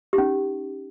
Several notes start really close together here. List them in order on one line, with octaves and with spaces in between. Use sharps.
G4 D#4 C#4